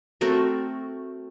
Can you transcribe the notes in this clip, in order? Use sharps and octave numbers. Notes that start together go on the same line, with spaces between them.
A3 C4 F#4 A#4